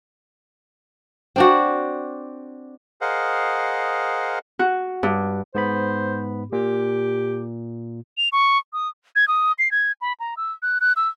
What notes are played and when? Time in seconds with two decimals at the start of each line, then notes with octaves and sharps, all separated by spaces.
1.36 C4 D4 F#4
3.01 G#4 A#4 C5 D#5 F5 F#5
4.59 F#4
5.03 G2
5.55 G#2 B3 C5 B5
6.52 A#2 G4
8.18 F7
8.32 C#6
8.73 D#6
9.16 G#6
9.28 D#6
9.59 C7
9.71 G#6
10.01 B5
10.20 A#5
10.37 E6
10.62 F#6
10.81 F#6
10.96 E6